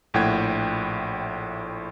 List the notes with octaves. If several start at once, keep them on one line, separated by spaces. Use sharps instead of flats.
A#1 A2 F#5 G5 G#6